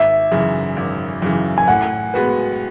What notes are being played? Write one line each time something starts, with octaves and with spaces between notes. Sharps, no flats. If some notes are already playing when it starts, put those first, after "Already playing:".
Already playing: G#1 E5
F#2 C#3 E3
G#1
F#2 C#3 E3
G#5
A2 F#5
G#3 B3 F#4 B4